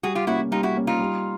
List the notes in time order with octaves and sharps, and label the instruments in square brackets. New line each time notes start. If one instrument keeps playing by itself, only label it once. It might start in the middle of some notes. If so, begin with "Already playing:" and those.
[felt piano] G3 [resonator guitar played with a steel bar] F#4 G#4
[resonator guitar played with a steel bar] F4 G4
[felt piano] A#3 C#4 [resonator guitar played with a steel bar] E4 F#4
[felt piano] G3 [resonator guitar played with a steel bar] D#4 F4
[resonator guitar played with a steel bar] E4 F#4
[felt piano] A#3 C#4
[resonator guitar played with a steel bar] D#4 F4
[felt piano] G3